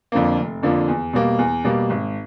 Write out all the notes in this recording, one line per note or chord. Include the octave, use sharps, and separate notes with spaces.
F2 D3 F3 A#3
F1
F2 D3 F3 A#3
E2
B2 G3 A#3
E2
B2 G3 A#3
G#1